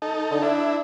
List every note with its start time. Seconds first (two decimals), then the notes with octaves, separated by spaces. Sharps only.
0.02 D#4 A4
0.31 D3
0.42 D4 E4